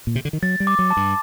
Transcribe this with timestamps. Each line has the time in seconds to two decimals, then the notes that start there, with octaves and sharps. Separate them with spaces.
0.07 A#2
0.15 C3
0.25 D3
0.33 D#3
0.42 F#3 A6
0.60 G3
0.67 D6
0.79 F#3
0.90 A5
0.97 G2